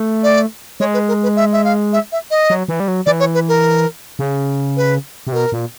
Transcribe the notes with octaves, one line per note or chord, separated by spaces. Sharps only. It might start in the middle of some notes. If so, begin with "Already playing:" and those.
Already playing: A3
D5
G#3 C#5
B4
A#4
B4
E5
E5
F5
E5
E5
D#5
F#3
E3
G3
F#3
E3 D5
C#5
B4
A#4
C#3
B4
C3
B2 A#4
A#2